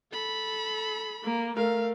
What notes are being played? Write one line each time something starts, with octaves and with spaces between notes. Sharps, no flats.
A4 B5
A#3
A3 A#4 F5